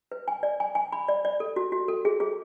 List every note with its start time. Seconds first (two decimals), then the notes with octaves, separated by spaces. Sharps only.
0.12 B4
0.28 G#5
0.43 D5
0.60 G#5
0.75 G#5
0.92 B5
1.08 D5
1.25 D5
1.40 A4
1.56 F#4
1.72 F#4
1.88 A4
2.05 G#4
2.20 G#4